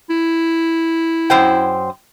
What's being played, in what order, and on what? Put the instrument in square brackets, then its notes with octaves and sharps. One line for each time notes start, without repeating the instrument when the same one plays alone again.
[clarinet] E4
[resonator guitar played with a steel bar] F#2 C5 G5